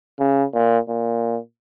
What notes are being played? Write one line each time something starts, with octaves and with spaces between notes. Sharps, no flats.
C#3
A#2
A#2